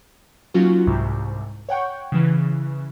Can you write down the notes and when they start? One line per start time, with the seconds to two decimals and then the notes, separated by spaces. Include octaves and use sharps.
0.54 F#3 A#3 C#4 D#4 F4 F#4
0.87 C2 G#2 C3
1.69 C#5 F#5 G5 C#6
2.12 C#3 E3